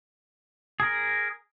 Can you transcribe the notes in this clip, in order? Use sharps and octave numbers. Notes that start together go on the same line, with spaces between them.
G#4 A#4